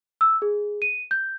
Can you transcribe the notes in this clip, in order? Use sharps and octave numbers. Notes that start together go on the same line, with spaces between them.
E6
G#4
D#7
G6